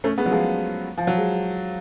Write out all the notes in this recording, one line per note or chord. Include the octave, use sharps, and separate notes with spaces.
A3 C#4
G#3 B3
F#3
F3 G#3
F3
F#3
G#3